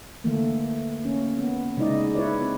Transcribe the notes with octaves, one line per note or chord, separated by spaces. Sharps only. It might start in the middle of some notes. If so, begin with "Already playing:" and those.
D3 E3 A3 A#3
A#3 C#4
B3
C#3 G#3 D#4 E4 D5 D#5
E4 B4 C#5 D5
C4